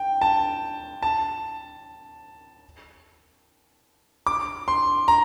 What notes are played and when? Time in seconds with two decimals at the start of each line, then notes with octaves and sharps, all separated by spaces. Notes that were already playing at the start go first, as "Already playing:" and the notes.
Already playing: G5
0.22 A5
1.03 A5
4.27 D6
4.68 C6
5.08 A#5